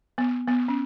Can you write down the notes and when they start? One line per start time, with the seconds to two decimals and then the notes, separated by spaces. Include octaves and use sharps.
0.18 B3
0.48 B3
0.68 C#4